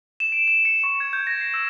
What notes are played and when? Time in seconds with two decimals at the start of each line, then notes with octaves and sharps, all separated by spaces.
0.20 E7
0.32 D7
0.48 E7
0.65 C#7
0.83 C#6
1.00 G#6
1.13 G6
1.27 A#6
1.41 C7
1.54 E6